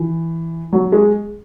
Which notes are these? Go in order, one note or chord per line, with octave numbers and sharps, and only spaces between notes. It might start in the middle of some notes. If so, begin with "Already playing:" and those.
Already playing: E3
F#3
G#3